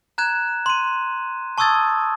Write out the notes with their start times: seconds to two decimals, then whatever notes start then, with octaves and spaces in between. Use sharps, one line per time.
0.18 A#5 F#6 G#6 E7
0.66 C6 D#7
1.58 A5 C#6 D#6 E6 G#6 A6